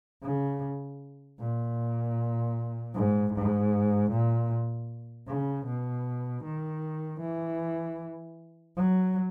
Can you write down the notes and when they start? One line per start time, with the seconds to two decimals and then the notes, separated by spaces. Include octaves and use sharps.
0.23 C#3
1.39 A#2
2.94 G#2
3.33 G#2
4.11 A#2
5.27 C#3
5.66 B2
6.44 D#3
7.20 E3
8.76 F#3